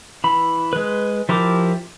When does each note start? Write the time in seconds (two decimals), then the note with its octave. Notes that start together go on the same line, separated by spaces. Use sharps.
0.24 E3 B5
0.73 G#3 B4
1.29 F3 E4 G4 A#4 D6